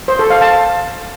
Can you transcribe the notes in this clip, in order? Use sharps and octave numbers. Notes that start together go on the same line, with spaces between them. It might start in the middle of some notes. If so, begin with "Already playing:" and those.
C5
A4
F5
A5